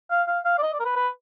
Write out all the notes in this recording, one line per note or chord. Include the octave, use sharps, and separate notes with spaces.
F5
F5
F5
D5
D#5
D5
A#4
B4
B4